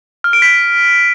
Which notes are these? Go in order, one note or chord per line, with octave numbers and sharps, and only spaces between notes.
F6
D7
B6